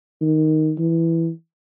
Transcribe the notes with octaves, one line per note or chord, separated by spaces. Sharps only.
D#3
E3